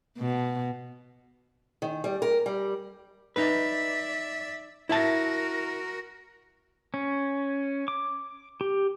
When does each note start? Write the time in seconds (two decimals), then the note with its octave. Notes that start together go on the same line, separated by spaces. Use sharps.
0.18 B2
1.82 D#3
2.04 G3
2.22 A#4
2.46 G3
3.36 D#4 B4 D5 E5
4.89 E4 F#4 A#4 E5 A5
6.94 C#4
7.88 D6
8.61 G4